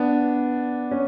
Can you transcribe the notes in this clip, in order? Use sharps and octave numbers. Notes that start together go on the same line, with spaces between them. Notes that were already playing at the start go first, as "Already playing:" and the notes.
Already playing: B3 D4
C#4